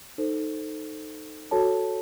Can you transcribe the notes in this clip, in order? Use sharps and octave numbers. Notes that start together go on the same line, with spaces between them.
D#4 A4 C5
F#4 A4 C#5 A5